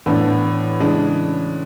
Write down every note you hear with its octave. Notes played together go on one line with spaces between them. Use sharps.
A2 E3 B3 D4
C#3 E3 G#3 D4